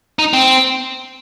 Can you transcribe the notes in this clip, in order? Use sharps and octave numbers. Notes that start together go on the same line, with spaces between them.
D#4
C4